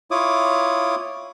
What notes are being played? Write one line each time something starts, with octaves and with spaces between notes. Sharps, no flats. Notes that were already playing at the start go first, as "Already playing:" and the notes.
E4 F4 C#5 D6 D#6